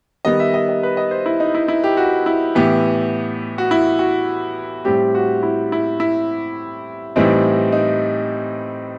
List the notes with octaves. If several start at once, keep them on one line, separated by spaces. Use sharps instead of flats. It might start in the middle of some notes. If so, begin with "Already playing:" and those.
D#3 G3 B3 D#5
E5
D#5
D#5
B4
D#5
C5
E4
D#4
E4
E4
G4
F#4
E4
A2 E3 B3 G4
F#4
E4
F#4
A2 G3 C4 G4
F#4
E4
E4
E4
A2 E3 G3 C4 D#4
D#4